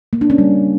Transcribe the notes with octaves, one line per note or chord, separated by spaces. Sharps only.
A#3
D4
C#4
G3